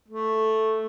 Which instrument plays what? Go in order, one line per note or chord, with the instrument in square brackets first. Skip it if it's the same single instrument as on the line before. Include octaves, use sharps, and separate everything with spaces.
[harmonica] A3